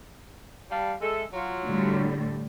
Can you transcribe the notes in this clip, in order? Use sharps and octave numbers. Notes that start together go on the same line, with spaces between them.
G3 F5 A5
G#3 A4 E5
F#3 F4
A2 D3 G3